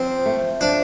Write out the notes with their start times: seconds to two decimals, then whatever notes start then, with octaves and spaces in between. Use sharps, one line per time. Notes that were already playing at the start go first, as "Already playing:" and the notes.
Already playing: F3 C4
0.26 A3
0.61 F3 D4